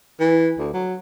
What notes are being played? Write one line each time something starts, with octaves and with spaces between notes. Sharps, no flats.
E3
D2
F#3